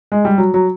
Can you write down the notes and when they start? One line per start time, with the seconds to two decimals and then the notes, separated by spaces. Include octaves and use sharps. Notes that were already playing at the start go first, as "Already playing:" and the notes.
0.12 G#3
0.25 G3
0.38 F#3
0.54 F#3